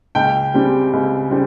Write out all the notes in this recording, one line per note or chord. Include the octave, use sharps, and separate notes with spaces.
C#2 G5
C#3 G3 C4
C#2
C#3 G3 C4